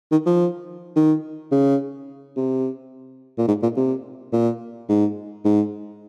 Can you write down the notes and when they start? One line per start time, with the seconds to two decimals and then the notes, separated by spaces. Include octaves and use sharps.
0.12 D#3
0.26 F3
0.96 D#3
1.51 C#3
2.36 C3
3.38 A#2
3.48 G#2
3.62 A#2
3.77 C3
4.32 A#2
4.89 G#2
5.45 G#2